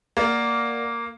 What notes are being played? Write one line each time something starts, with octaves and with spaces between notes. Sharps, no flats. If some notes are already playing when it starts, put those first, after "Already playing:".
A#3 A#4 D5 F#5